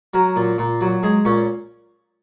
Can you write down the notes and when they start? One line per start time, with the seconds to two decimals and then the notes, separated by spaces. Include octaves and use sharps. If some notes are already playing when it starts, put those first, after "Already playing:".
0.14 F#3 A#4
0.36 A#2
0.58 A#2
0.81 F#3
1.03 G#3 G#4
1.25 A#2 C#4